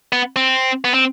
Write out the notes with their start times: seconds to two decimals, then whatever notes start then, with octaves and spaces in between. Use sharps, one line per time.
0.13 B3
0.36 C4
0.85 B3
0.94 C4